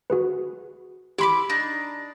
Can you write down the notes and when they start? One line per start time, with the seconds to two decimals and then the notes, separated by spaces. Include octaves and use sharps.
0.10 F#4 G#4 B4
1.18 E4 G4 B5 C6 D6 B6
1.50 D4 D#4